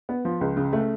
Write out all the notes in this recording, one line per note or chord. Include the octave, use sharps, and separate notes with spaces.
B3
F3
C#2
C#3
A3